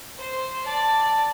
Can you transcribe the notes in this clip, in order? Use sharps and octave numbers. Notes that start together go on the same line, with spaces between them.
C5
D5 A5